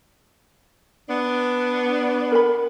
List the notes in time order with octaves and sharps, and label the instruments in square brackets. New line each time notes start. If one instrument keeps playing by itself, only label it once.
[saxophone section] B3 D4
[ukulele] A#4 B5